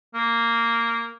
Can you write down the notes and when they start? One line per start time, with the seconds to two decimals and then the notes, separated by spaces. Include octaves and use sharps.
0.14 A#3